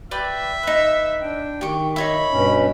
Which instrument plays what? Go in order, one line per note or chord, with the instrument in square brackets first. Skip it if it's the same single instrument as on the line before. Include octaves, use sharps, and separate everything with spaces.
[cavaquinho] B4 D5 G5 [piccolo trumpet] E5
[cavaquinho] D#4 B4
[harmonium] D4 G5
[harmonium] D#3 [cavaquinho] G4 C#6
[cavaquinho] D#4 C#5 E5 [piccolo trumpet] B5
[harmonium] G2 B2 C#4